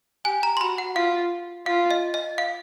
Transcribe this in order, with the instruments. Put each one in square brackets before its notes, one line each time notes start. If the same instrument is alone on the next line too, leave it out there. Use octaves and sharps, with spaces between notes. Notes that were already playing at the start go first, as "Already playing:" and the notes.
[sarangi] G4 [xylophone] G#5
[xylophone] A#5
C6
[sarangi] F#4 [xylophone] B5
[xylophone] F#5
[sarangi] F4 [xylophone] F5
[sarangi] F4 [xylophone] F5
[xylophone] D#5
D#5
F5